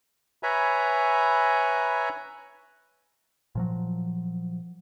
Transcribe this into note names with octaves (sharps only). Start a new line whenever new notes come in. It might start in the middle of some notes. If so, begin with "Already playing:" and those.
B4 C#5 E5 G#5 A#5 B5
A#2 F3 F#3